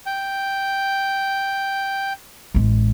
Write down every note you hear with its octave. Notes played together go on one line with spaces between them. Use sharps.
G5
A1 G#3